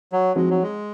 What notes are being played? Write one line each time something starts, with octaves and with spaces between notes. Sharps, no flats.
F#3
F3 G#3 C4 D#4 F#4
F#3
G#3